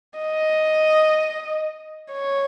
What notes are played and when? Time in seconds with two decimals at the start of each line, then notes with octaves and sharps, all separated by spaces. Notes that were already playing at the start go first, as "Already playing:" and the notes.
0.19 D#5
2.13 C#5